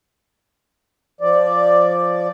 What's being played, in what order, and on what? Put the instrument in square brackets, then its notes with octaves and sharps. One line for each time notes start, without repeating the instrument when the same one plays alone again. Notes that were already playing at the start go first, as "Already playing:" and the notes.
[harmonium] F3 D5